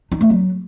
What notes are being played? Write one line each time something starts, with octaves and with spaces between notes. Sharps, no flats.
D#4
A3
F#3